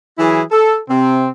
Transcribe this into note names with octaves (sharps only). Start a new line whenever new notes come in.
E3 F#3 E4 G#4
A4
C3 C4